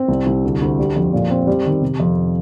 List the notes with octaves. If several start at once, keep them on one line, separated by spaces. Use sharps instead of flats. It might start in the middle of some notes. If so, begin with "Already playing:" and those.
Already playing: C4
C2
C2
D2
D2
G3
F2
A#2
C4
G3
D#3
C3
F2